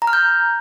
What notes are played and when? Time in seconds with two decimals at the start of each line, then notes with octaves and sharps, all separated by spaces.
0.02 A#5
0.07 F6
0.13 G6